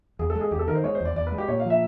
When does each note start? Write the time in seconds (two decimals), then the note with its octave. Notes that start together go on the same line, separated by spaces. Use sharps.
0.19 E2 G#4
0.30 A4
0.36 G#3
0.41 G#4
0.51 E2 G4
0.59 A4
0.68 D#3 A#4
0.75 C5
0.84 G#3 C#5
0.95 C5
1.01 E2 D5
1.16 E2 D5
1.27 B4
1.32 G#3
1.38 G4
1.48 A#2 C#5
1.60 F5
1.65 F3 E5